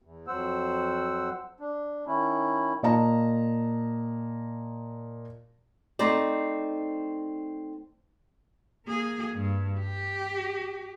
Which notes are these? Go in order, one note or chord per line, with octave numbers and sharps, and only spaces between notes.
E2
F2 F#3 C5 F#5 E6
D4
D#3 C#4 E4
A#2 D#5 A5 A#5
A3 C4 D#4 C5 D5
A#3 G#4
G2
G4